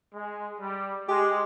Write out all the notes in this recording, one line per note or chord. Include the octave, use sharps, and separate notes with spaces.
G#3
G3
G#3 G4